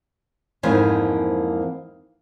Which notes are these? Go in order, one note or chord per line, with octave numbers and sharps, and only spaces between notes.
F2 G#2 E3 A#3 C5 G#5